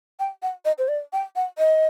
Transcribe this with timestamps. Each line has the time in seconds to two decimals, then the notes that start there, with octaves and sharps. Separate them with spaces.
0.20 G5
0.42 F#5
0.65 D#5
0.78 C5
0.88 D5
1.13 G5
1.36 F#5
1.58 D#5